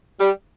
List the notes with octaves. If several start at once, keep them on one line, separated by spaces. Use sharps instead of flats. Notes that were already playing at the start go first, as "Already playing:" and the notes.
G3